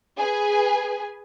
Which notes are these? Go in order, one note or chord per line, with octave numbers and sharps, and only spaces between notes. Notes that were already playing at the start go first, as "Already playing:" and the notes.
G#4 B4 G#5